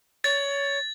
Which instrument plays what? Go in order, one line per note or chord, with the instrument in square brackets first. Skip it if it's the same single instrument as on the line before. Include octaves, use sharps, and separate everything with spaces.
[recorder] C#5 [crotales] A6